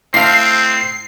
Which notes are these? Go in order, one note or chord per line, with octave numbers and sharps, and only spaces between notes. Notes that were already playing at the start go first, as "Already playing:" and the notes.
A2 C4 F5 C7